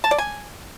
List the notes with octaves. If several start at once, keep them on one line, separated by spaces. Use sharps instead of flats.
A5
D5
G#5